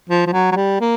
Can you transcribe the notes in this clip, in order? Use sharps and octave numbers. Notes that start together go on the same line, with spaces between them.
F3
F3
F#3
F#3
G3
A#3